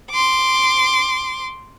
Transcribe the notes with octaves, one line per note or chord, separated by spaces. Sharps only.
C6 D6